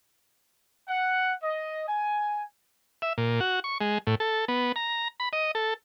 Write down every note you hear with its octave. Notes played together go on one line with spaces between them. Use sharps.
F#5
D#5
G#5
E5
A#2
F#4
C#6
G#3
A2
A4
B3
A#5
B5
D#5
A4